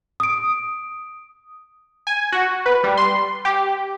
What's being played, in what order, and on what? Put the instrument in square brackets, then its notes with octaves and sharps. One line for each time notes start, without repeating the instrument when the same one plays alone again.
[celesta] D#6 D7
[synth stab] G#5
F#4
B4
G3
C6
G4